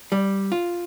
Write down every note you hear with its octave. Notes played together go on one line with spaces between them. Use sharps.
G3
F4